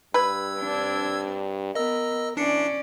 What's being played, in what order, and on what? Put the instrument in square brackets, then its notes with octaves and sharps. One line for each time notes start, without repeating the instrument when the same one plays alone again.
[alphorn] G2 [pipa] B4 [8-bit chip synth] E6 G#6
[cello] C4 D4
[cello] B3 [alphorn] A#4 [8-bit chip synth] D#5 E6
[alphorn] E3 [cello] C#4 D5 [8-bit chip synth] D4 C7 C#7